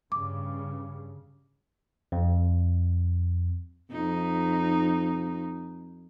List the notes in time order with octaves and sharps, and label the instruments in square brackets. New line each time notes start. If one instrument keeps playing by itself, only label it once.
[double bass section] G2 C#3 [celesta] D6
[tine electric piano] F2
[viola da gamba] F2 D#4